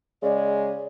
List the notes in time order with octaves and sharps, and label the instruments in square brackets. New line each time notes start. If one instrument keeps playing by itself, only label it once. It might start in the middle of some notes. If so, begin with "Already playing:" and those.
[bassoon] C#3 [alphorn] G#3 [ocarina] D5